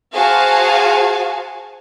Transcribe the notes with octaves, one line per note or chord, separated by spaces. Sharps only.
F#4 G#4 C5 F5 G#5 A5